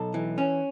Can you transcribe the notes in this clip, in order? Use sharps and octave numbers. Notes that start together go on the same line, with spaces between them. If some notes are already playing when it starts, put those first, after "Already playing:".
Already playing: B1 A4
E3
C#4